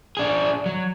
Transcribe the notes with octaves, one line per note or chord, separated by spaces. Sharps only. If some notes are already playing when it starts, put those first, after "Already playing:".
D4 G#4
F#3